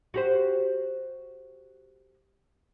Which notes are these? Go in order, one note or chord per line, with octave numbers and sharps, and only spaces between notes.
F#4 G4 C5